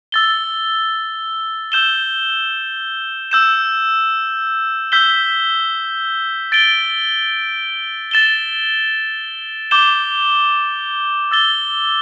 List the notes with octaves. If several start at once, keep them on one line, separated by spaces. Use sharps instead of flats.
E6 A6 G7
E6 G6 E7 G7
E6 G6 E7
E6 G6 B6 G7
A6 D7 G7
A6 E7 G7
D6 G6 E7 G7
E6 A6 G7